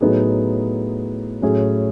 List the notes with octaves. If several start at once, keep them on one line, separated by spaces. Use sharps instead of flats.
A2 F#3 B3 D#4 G#4
A2 F#3 C#4 G#4